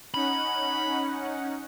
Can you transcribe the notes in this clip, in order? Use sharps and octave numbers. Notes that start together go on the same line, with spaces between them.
C#4 D#4 F#5 B5